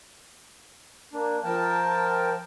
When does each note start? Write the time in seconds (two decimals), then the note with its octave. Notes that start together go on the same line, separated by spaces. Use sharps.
1.13 A#3 D4
1.44 F3 A#4 G5 A5